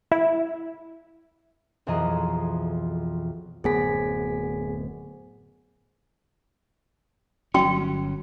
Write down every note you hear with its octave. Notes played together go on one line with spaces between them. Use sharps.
E4
B1 F2 E3 G#4 D#5 A#5
D1 F#2 B3 G#4 G#5 B6
G1 F#3 C#4 F#4 G5